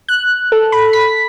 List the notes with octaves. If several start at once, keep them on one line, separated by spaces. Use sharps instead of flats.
F#6
A4
B5
B6